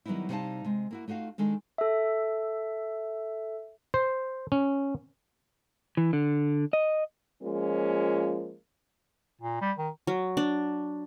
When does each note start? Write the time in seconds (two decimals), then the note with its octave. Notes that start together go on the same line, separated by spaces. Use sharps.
0.06 D#3 F#3 G3 B3 D#4 E4
0.29 C3 G3 D#4 B4 F5 A5
0.65 C3 G#3
0.91 A#3 E4 F#4
1.08 A3 D#4 F4 F#4 F5
1.38 D#3 G#3 D4 A4
1.78 A4 E5
3.94 C5
4.52 C#4
5.97 E3
6.13 D3
6.73 D#5
7.43 F3 G#3 A#3 C#4 F4
9.41 A#2
9.61 G3
9.78 D#3
10.07 F#3
10.37 D4